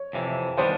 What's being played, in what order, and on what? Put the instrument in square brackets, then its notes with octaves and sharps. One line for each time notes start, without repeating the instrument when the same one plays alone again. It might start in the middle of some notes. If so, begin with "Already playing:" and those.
Already playing: [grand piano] C#5
[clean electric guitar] F2 C3 E3
[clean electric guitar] D#3 G3 B3 D4 [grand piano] C5